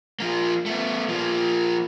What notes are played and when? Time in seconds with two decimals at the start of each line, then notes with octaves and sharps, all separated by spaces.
0.20 F3 A#3
0.66 A3 B3
1.08 F3 A#3